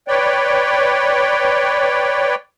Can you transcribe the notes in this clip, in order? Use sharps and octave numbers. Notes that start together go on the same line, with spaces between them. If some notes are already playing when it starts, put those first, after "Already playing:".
B4 C#5 D5 G5